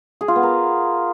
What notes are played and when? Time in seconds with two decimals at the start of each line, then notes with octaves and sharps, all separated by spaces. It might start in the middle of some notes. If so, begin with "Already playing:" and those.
0.21 G#4
0.28 F4
0.36 B3
0.43 A#4